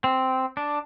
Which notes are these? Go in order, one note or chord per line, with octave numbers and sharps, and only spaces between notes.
C4
D4